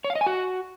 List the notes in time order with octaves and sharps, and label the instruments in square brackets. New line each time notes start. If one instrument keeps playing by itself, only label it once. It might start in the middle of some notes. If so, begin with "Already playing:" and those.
[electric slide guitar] C#5
F5
D#5
G#5
F#4